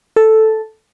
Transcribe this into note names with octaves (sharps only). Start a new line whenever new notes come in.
A4